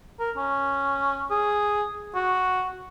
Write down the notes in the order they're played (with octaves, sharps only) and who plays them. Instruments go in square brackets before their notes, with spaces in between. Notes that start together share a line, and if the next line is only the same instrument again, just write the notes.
[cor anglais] A#4
C#4
G#4
F#4